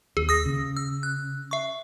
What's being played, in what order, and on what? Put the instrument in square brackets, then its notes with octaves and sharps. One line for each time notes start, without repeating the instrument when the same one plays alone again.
[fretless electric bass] D#2 [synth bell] G#4
[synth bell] D#6 A#6
[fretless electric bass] C#3
[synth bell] E6
F#6
E5 C#6